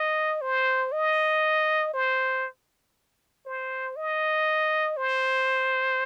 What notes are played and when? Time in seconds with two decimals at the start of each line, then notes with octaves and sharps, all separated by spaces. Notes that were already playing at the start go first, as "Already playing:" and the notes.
Already playing: D#5
0.41 C5
0.92 D#5
1.94 C5
3.46 C5
3.96 D#5
4.97 C5